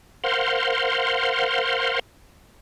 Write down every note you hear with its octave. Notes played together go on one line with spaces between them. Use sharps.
A#4 C5 F5 F#5 C6